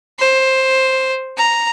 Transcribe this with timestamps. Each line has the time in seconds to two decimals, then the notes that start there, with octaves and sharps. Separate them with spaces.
0.19 C5
1.37 A#5